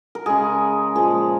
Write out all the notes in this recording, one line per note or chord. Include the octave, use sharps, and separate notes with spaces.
A#4
C#3 G#3 G#4
A#2 F3 G#3 G#4